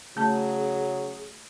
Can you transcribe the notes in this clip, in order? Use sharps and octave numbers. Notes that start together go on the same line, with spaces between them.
C#3 F#3 A3 G#4 A5